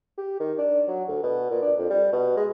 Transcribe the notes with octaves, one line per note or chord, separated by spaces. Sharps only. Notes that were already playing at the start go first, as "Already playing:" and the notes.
G4
D#3
D4
F#3
D2
B2
A#2
D4
F2
G3
B2
G#3